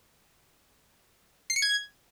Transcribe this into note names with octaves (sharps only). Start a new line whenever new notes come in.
C7
C#7
G#6